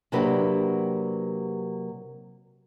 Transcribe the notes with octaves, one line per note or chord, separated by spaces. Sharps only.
C3 F#3 A#3 D4 G4 B4